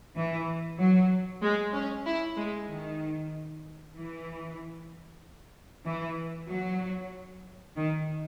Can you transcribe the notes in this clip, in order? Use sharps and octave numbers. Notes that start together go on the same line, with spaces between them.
E3
F#3
G#3
C#4
E4
G#3
D#3
E3
E3
F#3
D#3